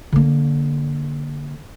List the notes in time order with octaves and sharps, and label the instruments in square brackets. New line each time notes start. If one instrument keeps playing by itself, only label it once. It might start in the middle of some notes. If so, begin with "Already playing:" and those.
[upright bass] D3 A#3